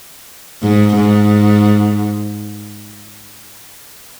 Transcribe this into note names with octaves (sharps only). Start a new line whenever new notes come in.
G#2
G#2